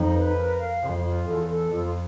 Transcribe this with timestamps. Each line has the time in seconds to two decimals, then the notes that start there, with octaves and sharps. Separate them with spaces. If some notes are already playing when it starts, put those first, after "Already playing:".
Already playing: F2 D#4
0.15 B4
0.36 A#4
0.59 F5
0.81 F2 F4
1.04 F4
1.26 E2 A4
1.49 A4
1.71 F2 F4